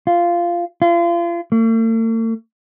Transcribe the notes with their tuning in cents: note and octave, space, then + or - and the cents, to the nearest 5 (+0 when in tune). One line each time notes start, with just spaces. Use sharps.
F4 -10
F4 -35
A3 +45